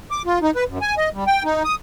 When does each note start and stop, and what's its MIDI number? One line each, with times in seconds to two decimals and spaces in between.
0.11 0.22 86
0.26 0.39 65
0.42 0.50 63
0.55 0.64 71
0.68 0.78 42
0.81 0.95 80
0.98 1.09 75
1.14 1.24 55
1.27 1.43 79
1.44 1.63 63
1.64 1.75 87